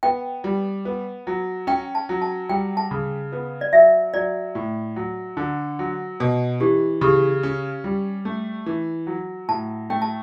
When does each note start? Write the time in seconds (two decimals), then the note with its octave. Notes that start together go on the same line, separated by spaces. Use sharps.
0.03 B3 G5
0.44 G3
0.85 B3
1.27 F#3
1.67 C#4 G5
1.95 A5
2.09 F#3
2.22 A5
2.49 G3 G5
2.77 A5
2.91 C#3
3.32 B3
3.61 D5
3.73 F#3 E5
4.14 F#3 D5
4.55 A2
4.96 F#3
5.37 D3
5.79 F#3
6.20 B2
6.60 E3 G4
7.01 C#3 G4
7.43 C#4
7.84 G3
8.25 A3
8.66 E3
9.07 F#3
9.49 A2 A5
9.90 A3 G5
10.02 A5